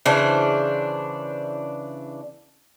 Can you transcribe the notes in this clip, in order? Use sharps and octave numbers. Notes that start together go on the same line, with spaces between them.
C#3 E3 D4 C5